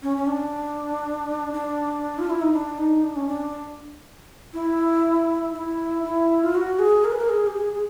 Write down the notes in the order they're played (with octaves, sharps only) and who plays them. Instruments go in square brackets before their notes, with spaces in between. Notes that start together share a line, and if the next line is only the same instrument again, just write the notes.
[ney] C#4
C#4
D4
D4
F4
E4
D#4
D4
D#4
D4
C#4
D4
E4
E4
E4
F4
F#4
G#4
A#4
B4
A#4
G#4
G4
G#4
G#4